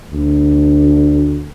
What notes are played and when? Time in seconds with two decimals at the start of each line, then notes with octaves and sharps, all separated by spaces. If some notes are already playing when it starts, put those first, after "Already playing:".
0.12 D2